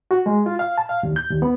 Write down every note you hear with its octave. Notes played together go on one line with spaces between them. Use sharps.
F#4
G#3
F4
F5
A5
F5
D#2
G6
D#2
B3